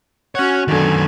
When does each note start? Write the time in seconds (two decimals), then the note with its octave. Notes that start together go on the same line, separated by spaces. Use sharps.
0.35 C#4 F#4 C#5 F#5
0.68 F#2 D3 D#3 G#5